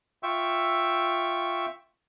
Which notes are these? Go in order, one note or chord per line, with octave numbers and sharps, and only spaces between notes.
F4 E5 G5 C#6 E6